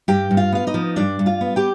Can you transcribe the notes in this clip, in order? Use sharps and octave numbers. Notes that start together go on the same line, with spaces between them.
G2 G4 G5
G2
F4 F5
B3 F5
D#4 D#5
F3
G2 D4 D5
G2
F4 F5
B3
G4 G5